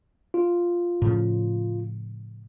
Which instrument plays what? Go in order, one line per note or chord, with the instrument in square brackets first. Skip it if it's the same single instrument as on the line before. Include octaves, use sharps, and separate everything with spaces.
[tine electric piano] F4
[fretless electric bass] A2 C#3 F3